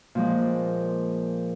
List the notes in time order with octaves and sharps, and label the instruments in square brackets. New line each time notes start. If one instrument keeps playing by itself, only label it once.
[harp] A#2 F3 G#3